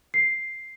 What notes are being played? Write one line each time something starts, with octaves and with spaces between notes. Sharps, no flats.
C7